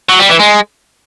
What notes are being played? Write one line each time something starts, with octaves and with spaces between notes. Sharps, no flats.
F#3
G3
E3
G#3